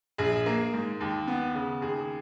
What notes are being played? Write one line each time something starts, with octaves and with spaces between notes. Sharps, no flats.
A#1 G#4
A#3
G#2
D#2
B3
C#3
D#2 G#4